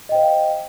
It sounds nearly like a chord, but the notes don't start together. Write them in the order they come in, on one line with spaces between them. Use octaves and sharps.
D#5 G5 C5 F5